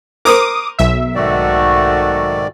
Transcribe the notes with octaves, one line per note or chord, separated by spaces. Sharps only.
A#4 C5 D6 D#6
B1 E5
G#2 D#3 A3 F#4 D5